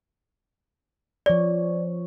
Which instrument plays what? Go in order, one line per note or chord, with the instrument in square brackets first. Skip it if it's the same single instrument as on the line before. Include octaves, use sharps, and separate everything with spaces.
[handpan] F3 C#5 [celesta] D5